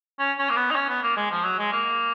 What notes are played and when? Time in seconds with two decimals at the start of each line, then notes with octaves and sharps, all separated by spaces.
0.19 C#4
0.38 C#4
0.49 A#3
0.56 B3
0.71 D#4
0.76 C#4
0.89 B3
1.02 A#3
1.17 G#3
1.31 F3
1.44 F#3
1.59 G#3
1.72 A#3